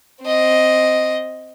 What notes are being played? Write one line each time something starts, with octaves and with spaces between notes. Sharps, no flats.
C4 D#5